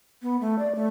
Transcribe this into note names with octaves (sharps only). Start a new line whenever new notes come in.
B3
A3
D5
A3